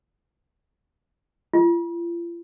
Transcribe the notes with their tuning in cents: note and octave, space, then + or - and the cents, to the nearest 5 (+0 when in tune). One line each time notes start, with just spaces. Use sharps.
F4 -40